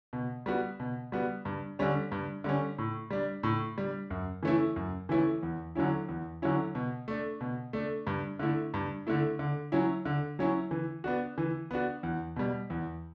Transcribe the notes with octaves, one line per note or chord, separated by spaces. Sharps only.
B2
G3 B3 F#4
B2
G3 B3 F#4
G2
D3 G3 C#4
G2
D3 G3 C#4
A2
G3 D4
A2
G3 D4
F#2
E3 A3 C#4 E4
F#2
E3 A3 C#4 E4
E2
D3 F#3 C#4 E4
E2
D3 F#3 C#4 E4
B2
A3 D4
B2
A3 D4
G2
D3 A3 E4
G2
D3 A3 E4
D3
F#3 C#4 E4
D3
F#3 C#4 E4
E3
B3 D4 F#4
E3
B3 D4 F#4
E2
B2 G3
E2